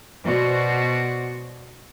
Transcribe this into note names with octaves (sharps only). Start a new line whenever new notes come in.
B2 F#4 C5 D5